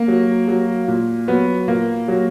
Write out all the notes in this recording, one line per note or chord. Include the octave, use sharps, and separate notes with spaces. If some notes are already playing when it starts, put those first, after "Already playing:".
Already playing: A#3
F#3
F#3
A#2
F#3 B3
A#2 A#3
F#3